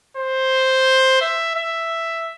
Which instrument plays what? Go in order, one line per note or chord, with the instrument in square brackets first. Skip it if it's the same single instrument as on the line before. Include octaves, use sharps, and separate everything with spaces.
[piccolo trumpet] C5
E5
E5